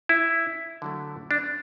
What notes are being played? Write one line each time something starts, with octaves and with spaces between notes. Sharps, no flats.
E4
D3 F#3 A3
D4